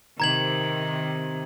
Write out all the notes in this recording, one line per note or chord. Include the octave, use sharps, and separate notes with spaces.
C3 D#3 A#5 G#6 F#7